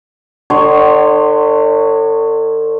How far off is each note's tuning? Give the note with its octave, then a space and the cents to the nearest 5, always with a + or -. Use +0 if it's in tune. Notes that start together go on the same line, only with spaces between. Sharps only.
D3 +40 C#5 +0 C6 +0